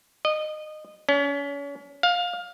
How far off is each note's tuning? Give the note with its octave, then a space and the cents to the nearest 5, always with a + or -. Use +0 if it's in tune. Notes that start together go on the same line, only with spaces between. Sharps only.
D#5 -20
C#4 +35
F5 +20